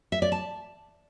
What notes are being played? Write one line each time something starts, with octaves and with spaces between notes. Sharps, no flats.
E5
D5
A5